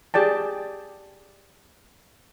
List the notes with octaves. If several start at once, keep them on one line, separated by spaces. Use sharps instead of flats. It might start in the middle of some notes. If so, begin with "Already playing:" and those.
G4 G#4 D5 G5 A5